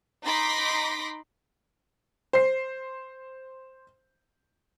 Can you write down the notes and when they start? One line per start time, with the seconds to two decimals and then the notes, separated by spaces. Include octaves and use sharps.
0.23 D#4 B5 C6 D6 A#6 B6
2.33 C5 C7